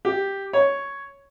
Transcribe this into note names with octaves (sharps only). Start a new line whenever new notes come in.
G4
C#5